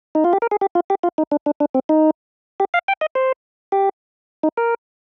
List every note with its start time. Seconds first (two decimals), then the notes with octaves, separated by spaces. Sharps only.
0.15 D#4
0.24 F4
0.33 G4
0.42 A#4
0.51 G#4
0.61 G4
0.75 F4
0.90 G4
1.03 F4
1.18 D#4
1.32 D4
1.46 D4
1.60 D4
1.74 C4
1.89 D#4
2.60 G4
2.74 F5
2.88 G5
3.01 D#5
3.15 C5
3.72 G4
4.43 D#4
4.57 A#4